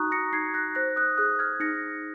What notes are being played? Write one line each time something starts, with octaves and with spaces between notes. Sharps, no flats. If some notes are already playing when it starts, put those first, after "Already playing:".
Already playing: D#4 F#4 A#5 C#6 D#6 F#6
A#6 C#7
D#4 G#6 C7
F#6 A#6
C5 F#6 A#6
D#6 F#6
G#4 D#6 F#6
F6 G#6
D#4 A#6 C#7